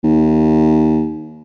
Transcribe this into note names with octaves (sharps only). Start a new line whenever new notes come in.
D#2